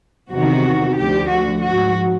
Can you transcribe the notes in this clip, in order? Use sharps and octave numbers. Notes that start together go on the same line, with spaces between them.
E2 C3 D#3 F#4
D2 D3 F3 G4
F#4
G#2 F3 F#4